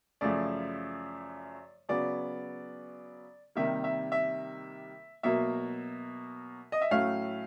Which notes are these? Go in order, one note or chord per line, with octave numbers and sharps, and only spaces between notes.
F#2 C#3 F3 A3 D5
C#3 F#3 B3 D5
C3 D#3 G3 A#3 E5
E5
E5
B2 F#3 A#3 E5
D#5
E5
A2 F#3 A3 C#4 F5